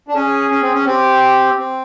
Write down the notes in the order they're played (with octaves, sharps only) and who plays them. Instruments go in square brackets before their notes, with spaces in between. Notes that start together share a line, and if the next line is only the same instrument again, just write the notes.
[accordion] D4
[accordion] C#4 [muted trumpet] G#4
[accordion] C#4
C4
C#4
[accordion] C4 [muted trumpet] G4
[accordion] C4